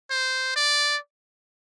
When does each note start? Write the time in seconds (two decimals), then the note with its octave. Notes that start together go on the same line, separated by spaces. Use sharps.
0.11 C5
0.56 D5